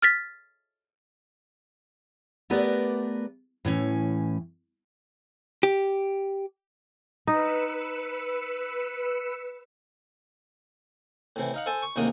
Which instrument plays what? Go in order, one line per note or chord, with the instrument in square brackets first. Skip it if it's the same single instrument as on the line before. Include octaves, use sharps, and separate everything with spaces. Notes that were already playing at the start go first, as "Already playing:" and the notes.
[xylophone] F6 A6 B6
[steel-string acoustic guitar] A3 B3 G4 A#4 B4 D5
A2 E3 C#4
[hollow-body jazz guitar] G4
[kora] D#4 [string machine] B4 E6 C#7
[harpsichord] A2 C3 E3
D#4 F5 F#5
A4 C5 G#5 A5 C6
C#6
A1 D#2 G#2 C3 A#3 D#6